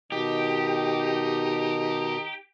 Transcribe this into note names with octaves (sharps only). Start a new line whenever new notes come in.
B2 D#3 D#4 G4